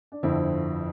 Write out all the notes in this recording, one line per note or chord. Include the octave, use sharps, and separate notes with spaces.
D4
G1 F2 D3 F3 C4 E4